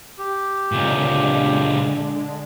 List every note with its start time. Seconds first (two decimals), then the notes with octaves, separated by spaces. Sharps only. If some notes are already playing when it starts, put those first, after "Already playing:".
0.18 G4
0.72 C#2 A#2 D3 G#3 D4